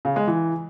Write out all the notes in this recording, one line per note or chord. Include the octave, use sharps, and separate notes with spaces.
C#3
G#3
E3